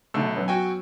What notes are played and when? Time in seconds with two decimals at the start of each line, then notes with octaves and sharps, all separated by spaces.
0.14 B1 D3 A3 E6
0.36 F#2 B3 C#4
0.48 F#4 G5 G#5